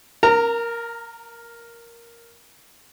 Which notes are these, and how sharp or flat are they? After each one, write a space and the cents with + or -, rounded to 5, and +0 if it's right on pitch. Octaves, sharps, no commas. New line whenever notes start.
A#4 +5 A#5 -30